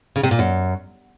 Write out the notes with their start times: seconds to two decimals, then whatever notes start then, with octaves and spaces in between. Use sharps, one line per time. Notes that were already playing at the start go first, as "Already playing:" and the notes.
0.16 C#3
0.23 C3
0.31 A#2
0.39 F#2